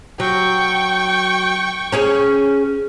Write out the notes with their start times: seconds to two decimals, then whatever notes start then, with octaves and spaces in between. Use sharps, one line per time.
0.20 F#3 G5 C#6
1.92 C#4 G#4 C#5